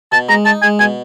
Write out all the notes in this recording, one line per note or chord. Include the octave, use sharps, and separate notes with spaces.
B2 A5
G#3 A#5
D#4 A5
G#3 G#5
B2 G#5